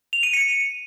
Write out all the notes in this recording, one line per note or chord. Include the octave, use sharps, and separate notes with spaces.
F7
D#7
C#7